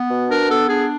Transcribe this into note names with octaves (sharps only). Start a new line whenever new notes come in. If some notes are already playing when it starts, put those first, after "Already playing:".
Already playing: B3
B2
D4 A#4
B3 A4
D4 G#4